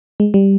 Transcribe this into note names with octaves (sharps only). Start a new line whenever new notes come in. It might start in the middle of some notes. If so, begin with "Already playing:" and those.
G#3
G3